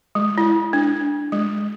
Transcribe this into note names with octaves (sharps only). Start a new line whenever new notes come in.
G#3
E4
D4
G#3